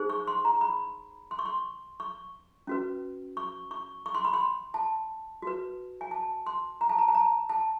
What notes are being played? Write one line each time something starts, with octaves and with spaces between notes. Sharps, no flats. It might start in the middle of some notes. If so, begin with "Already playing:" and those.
Already playing: D#4 G#4 C5
C#6
C6
A#5
B5
C6
C#6
C6
C#6
C#4 F#4 B4
C#6
C#6
C#6
C6
B5
C6
A5
F#4 B4
G#5
A5
C6
A#5
A5
A#5
A5
A#5
A5